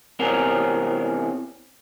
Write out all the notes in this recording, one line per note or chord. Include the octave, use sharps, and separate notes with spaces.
E2 C3 C4 C#4 A#4